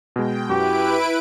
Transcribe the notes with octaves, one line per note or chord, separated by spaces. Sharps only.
B2 G#3 G5
F#2 E4 F#4 G4 B4 D7